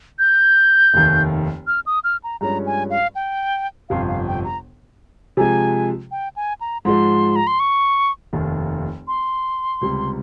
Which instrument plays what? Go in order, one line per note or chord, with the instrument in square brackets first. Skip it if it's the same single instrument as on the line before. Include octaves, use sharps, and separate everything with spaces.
[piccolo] G6
[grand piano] F1 D#2 D#3
[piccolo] F6
D#6
F6
A#5
[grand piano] G2 F3 G#3 C#4 [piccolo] A#5
[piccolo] G#5
F5
G5
[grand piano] G1 F2 C3 [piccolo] F5
[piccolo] F5
G5
A#5
[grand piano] C3 F3 G#3 [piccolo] G#5
[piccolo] G5
G#5
A#5
[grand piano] G#2 F3 G#3 [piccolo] C6
[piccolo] A#5
C6
C#6
[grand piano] F1 D#2 D#3
[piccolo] C6
[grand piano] C#2 C3 G3